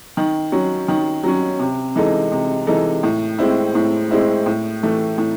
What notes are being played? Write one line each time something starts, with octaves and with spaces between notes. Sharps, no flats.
D#3
F#3 C#4
D#3
F#3 C#4
C3
E3 G#3 D#4 A4
C3
E3 G#3 D#4 A4
A2
G#3 C4 E4
A2
G#3 C4 E4
A2
E3 A3
A2